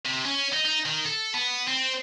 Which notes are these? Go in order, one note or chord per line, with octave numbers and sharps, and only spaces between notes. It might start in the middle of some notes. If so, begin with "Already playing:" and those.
C3
C#4
D#4
D#4
D#3
A4
B3
C4